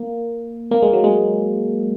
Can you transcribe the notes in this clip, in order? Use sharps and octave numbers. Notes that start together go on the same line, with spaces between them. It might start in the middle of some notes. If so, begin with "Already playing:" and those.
Already playing: A#3
A#3
G#3
F#3
G#3